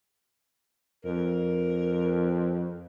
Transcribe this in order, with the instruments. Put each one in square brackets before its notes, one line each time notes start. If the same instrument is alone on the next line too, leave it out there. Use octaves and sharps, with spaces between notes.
[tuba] F2 [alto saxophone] A#4